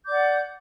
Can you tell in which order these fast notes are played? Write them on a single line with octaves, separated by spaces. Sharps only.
G6 D6 D5 F#5